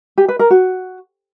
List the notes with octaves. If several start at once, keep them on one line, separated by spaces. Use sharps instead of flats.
G4
B4
A#4
F#4